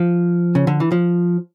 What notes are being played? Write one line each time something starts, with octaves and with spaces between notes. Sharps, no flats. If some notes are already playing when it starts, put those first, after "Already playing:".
Already playing: F3
C#3
D3
E3
F3